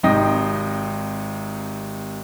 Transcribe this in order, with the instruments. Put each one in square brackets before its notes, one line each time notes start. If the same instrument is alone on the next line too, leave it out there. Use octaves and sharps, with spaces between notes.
[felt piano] G#1 C3 D#4 G5 D#6 A#6